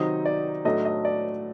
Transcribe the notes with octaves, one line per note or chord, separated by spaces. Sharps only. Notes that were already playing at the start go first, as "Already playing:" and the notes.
Already playing: C3 D#3 F#3 C4 D#4 D#5
D5
A2 F#3 A3 D4 D#5
D#5
D5